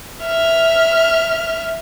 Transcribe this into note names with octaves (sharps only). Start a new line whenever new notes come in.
E5 F6